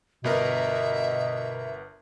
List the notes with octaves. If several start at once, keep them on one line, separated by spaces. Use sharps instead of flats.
G1 B2 B3 A#4 E5